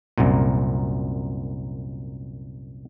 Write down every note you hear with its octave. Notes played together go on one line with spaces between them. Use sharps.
C2 F#2 A#2